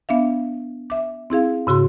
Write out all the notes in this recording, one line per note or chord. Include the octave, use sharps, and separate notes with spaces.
B3 D4 E5 F5
E5 D6
C4 E4 G#4 F5
G#2 C#3 F#4 C6